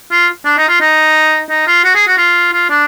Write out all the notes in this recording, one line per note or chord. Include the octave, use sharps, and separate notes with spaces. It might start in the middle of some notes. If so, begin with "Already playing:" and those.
F4
D4
D#4
F4
D#4
D#4
F4
F#4
G#4
F#4
F4
F4
D4